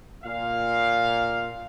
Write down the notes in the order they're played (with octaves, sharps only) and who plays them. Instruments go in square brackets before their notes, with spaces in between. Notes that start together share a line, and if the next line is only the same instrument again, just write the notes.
[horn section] A#2 F5